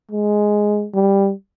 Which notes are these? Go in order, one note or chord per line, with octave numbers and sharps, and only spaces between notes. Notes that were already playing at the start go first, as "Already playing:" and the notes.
G#3
G3